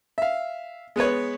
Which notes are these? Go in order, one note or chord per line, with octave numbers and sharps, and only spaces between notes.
E5 F5
G#3 B3 B4 C#5